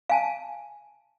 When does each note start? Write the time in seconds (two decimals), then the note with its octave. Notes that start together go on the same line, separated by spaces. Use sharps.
0.10 F5 G#5 A5